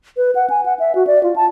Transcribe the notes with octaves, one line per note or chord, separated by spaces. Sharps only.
B4
F#5
G#5
F#5
E5
F#4
D5
F4
A5